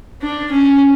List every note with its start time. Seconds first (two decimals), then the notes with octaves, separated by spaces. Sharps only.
0.22 D4
0.52 C#4